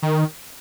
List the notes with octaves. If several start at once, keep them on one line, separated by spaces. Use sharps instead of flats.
D#3